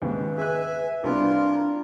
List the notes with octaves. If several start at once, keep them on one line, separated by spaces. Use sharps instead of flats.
D#2 G#2 C#3 B4
G#4 E5 G#5 F#6
C2 G3 B3 D4 F4 A#4